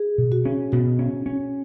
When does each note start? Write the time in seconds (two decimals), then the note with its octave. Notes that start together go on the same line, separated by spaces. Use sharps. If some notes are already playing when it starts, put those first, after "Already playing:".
Already playing: G#4
0.18 B2
0.32 F#4
0.45 C#4
0.72 B2 F#4
0.99 C#4
1.26 C#4